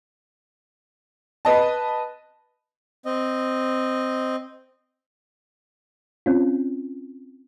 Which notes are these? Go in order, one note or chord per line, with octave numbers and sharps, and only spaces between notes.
B4 D#5 A5
C4 D#5
C4 C#4 F4